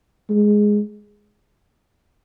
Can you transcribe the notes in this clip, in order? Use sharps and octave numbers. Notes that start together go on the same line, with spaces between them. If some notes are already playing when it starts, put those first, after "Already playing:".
G#3